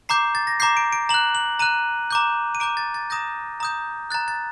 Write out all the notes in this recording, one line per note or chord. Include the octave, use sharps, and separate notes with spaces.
A#5 D6 G6 C7
A6
A#6
A#5 D6 G6 C7
D7
D7
A#5 F#6 F#7
F#7
A#5 F#6 D#7
A#5 D6 G6
D#7
A#5 D6 G6 D7
A6
A6
A#5 D#6 G6 A#6
A#5 D#6 G6
A#5 F#6 A6
A6